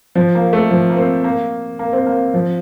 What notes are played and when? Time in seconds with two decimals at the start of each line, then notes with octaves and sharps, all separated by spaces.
0.15 F3
0.35 A#3
0.53 A3
0.71 F3
0.90 A#3
0.97 C4
1.24 A#3
1.79 A#3
1.93 C4
2.06 A#3
2.34 F3